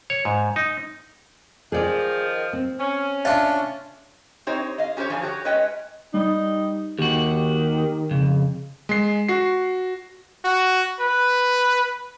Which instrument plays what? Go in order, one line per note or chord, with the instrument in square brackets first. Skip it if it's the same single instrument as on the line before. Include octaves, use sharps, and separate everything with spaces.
[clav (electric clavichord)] C#5
G#2
D#4
[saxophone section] D#3 F3 [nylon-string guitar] G#4 D5
[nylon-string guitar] C4
[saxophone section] C#4
[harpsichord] D4 F4 [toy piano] E5
[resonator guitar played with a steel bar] C4 D#4 G4 C5 C#5
D#5 F5
C#4 G4 G#4 C5 C#5
G2 F3 F5 G#5
F#4 G4 C5 C#5
G#3 C#4 B4 C#5 D#5 G5
[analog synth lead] G3 [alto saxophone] D#4
[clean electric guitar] D#2 F#4 [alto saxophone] D#3 [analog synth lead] G4
[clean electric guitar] F2 [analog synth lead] C#3
[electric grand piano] G#3 C7
F#4 C7
[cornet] F#4
B4